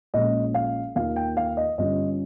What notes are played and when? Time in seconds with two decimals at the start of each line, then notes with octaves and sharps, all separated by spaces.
0.14 A#1 A#2 G#3 C#4 D#5
0.54 F5
0.95 D#2 D#3 A#3 F4 F5
1.16 G5
1.37 F5
1.57 D#5
1.78 G1 G2 G3 C#4 F4 D#5